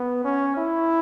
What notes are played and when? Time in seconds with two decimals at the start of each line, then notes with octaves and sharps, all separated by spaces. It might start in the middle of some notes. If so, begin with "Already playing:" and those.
Already playing: B3
0.25 C#4
0.57 E4